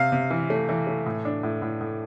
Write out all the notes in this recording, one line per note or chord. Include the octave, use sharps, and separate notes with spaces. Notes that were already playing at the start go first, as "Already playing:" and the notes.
Already playing: C3 F5
C3
E3
A3
E3
A3
A2
D4
A2
A2
A2